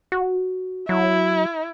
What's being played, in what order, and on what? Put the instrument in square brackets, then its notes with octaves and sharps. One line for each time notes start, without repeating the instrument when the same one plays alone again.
[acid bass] F#4
[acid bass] F#3 [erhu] E4